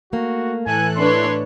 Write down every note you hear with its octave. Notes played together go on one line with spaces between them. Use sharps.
A3 A#3 F#4
A2 E3 A4 G#5 F#6
D4 B4 C#5 C6